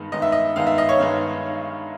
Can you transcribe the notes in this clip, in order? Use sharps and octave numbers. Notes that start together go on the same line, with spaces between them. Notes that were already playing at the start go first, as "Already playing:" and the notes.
Already playing: G2 D#3 G#3 B3
G2 D#3 G#3 B3 D#5
E5
D#5
G2 D#3 G#3 B3 F5
E5
D#5
C#5
G2 D#3 G#3 B3